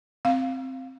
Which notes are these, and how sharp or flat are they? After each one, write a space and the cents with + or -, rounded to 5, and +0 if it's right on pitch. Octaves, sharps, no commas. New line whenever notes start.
C4 +0 F5 +0